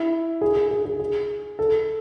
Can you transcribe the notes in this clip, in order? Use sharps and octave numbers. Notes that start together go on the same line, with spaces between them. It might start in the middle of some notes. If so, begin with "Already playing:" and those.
Already playing: E4
G#4
G#4
G#4
G#4
G#4
A4